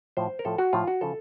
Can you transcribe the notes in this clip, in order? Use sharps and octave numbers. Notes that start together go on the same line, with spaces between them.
A2 F3 C5
A#4
A2 F3 A4
F#4
A2 F3 F4
F#4
C#3 F3 A4